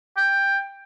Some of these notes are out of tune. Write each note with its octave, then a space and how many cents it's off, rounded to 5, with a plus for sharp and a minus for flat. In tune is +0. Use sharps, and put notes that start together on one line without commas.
G5 +10